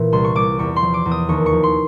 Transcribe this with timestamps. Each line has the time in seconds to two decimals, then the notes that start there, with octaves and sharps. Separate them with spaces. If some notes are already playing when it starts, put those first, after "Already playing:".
Already playing: A#2 E3
0.12 C2 C6
0.24 C#6
0.35 C2 D6
0.59 E2 C#6
0.76 C6
0.82 F3
0.94 D6
1.05 E2
1.11 D#6
1.28 D#2 C#6
1.46 C#6
1.52 F3
1.63 C6